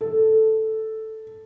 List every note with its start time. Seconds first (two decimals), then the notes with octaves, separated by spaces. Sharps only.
0.01 A4